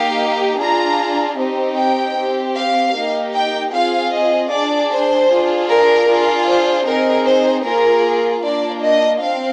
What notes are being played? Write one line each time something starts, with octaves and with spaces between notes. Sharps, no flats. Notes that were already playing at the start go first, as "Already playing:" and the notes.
Already playing: A#3 D#4 G4 F5
D4 F4 G#4 A#5
C4 D#4 G4
G5
C4 G4
F5
A#3 D#4 G4
G5
C4 F4 G#4 F5
D#5
D4 G#4 D5
C5
D4 F4 G#4
A#4
D4 F4 G#4
C5
C4 D#4 G#4 A#4
C5
A#3 F4 G#4 A#4
A#3 D4 F4 D5
D#5
C4 F5